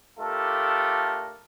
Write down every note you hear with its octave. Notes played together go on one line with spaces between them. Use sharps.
A3 D4 F4 G4 A4 A#4